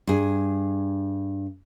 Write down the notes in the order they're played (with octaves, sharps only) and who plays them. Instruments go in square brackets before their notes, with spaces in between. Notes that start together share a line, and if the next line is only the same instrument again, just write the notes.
[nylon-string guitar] G2 G#4